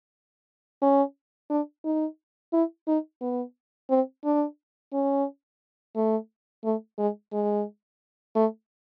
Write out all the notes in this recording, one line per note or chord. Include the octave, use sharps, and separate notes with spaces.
C#4
D4
D#4
E4
D#4
B3
C4
D4
C#4
A3
A3
G#3
G#3
A3